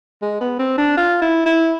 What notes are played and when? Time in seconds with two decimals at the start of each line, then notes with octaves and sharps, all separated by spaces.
0.22 G#3
0.40 B3
0.59 C4
0.77 D4
0.97 F4
1.22 E4
1.46 E4